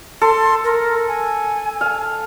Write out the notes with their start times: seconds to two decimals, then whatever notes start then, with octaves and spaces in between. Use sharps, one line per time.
0.21 A4 C6
0.64 A#4
1.08 G#5
1.81 F5